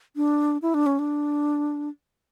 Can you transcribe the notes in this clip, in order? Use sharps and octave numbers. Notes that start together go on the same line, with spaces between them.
D4
E4
D4
C#4
D4